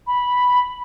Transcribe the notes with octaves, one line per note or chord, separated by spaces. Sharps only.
B5